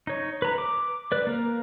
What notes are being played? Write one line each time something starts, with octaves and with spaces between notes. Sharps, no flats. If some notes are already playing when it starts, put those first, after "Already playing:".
D#4 C#5
B4 A#5
D6
B4 D5
A#3 A#4